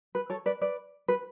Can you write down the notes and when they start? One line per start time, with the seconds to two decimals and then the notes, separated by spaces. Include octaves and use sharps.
0.15 B4
0.30 A4 C#5
0.46 B4 D5
0.61 B4 D5
1.08 B4